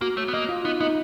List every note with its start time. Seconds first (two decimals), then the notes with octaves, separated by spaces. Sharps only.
0.01 A#3 F#4
0.17 A3 C#5
0.28 B3
0.34 A#3 D#5
0.49 F4
0.65 B3 D#4
0.80 B3 D#4